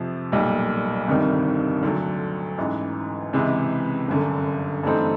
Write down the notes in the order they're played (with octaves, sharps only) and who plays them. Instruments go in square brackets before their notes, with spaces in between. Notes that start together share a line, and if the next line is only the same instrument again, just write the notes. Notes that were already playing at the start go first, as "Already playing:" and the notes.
Already playing: [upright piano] F2 C3 F3
B1 A#2 G3
G1 F2 C3 D#3 G3
D2 D3 F#3
A1 G#2 E3
C#2 C3 E3 G#3
G1 F#2 D3
G2 E3 A3 C4 D#4